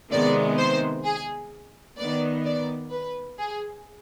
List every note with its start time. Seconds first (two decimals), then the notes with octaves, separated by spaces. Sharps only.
0.11 C3 D#3 G#3 B3 D5
0.58 C5
1.04 G#4
1.98 D#3 B3 D5
2.45 D5
2.91 B4
3.38 G#4